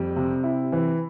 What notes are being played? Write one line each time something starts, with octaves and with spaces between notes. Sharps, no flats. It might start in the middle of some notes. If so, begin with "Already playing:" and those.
Already playing: F2 G3
C3
E4
E3